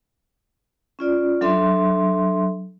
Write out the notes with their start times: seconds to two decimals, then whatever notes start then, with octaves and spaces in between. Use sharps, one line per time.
0.99 C#4 F4 D5
1.41 F#3 D4 A4 E5 C6